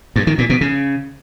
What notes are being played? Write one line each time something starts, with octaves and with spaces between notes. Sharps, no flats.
G2
D#3
A#2
B2
C#3